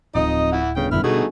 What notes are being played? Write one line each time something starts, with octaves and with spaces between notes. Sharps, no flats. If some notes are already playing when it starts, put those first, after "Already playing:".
D1 F2 D#4 D#5
E4 F#5
G1 C#3 G5
E1 F#2 D3 E4 F6
B2 A3 D#4 F#4 G#4